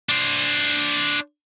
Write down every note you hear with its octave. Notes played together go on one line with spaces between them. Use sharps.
D4 C5